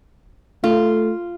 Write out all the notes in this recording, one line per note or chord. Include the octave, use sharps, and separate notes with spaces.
A3 F4